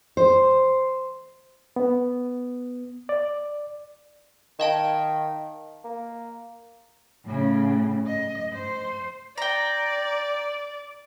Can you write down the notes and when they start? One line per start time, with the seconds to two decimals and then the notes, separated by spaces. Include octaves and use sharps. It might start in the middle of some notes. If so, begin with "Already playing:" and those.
0.17 C5
1.76 B3
3.09 D5
4.60 D#3 D#5 F5 A5
5.84 A#3
7.25 A2 C#3
8.06 D#5
8.53 C5
9.38 D5 G5 A#5